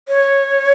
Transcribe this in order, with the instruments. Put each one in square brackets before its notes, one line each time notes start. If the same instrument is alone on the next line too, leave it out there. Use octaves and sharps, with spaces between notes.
[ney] C#5